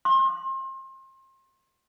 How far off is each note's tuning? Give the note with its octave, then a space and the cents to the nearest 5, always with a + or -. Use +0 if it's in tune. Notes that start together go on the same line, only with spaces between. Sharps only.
C6 +35